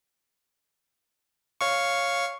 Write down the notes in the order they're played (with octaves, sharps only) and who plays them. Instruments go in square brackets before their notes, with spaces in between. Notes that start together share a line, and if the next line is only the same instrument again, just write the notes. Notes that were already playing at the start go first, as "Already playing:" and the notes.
[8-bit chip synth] C#5 F5 C#6